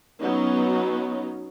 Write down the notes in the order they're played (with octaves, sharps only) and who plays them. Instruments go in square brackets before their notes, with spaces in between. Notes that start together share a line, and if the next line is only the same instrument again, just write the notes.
[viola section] F#3 B3 C#4 D#4